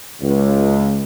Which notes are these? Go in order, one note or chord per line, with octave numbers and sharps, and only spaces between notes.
C#2